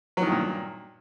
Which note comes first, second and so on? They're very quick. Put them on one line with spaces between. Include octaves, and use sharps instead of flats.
F#3 D#3 G2 A#2